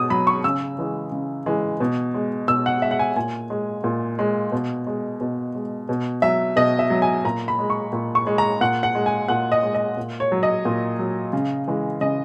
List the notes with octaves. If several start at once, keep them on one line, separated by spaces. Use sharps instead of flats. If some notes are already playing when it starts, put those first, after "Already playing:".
Already playing: B2 D#6
F#3 B5
C#6
C#3 E6
E3 G#3
C#3
E3 G#3
B2
G#3
B2 E6
F#5
G#3 E5
F#5
G#5
A#2 G#5
G#3
A#2
G#3
B2
G#3
B2
G#3
B2
F#3 E5
B2 D#5
E5
F#3
G#5
A#2 A#5
B5
G#3
C#6
A#2
C#6
G#3
A#5
A#2 F#5
F#5
G#3
G#5
A#2 F#5
D#5
G#3
D#5
A#2
C#5
F#3
D#5
A#2
F#3
C#3
E3 G#3
C#3 D#5